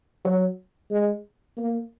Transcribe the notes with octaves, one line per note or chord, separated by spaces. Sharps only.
F#3
G#3
A#3